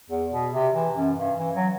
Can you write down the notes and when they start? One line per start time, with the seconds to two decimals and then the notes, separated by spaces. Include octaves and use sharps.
0.10 E2
0.32 B2
0.53 C3
0.74 E3
0.96 F#2
1.18 G2
1.39 E3
1.56 F#3